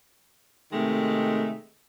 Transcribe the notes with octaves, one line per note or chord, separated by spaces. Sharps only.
C3 D#3 G#3 A3